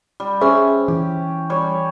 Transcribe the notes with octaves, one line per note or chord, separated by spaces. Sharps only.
G3
C#4 G#4 C5 E5
E3 G4
G3 C#5